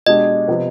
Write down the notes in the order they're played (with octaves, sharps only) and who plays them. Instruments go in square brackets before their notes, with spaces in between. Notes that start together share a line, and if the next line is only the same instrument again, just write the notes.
[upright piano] B2 G#3 D4 G4 [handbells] D#5
[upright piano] C3 F3 B3